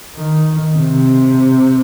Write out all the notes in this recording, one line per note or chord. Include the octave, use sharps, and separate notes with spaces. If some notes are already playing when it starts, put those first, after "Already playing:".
D#3
C3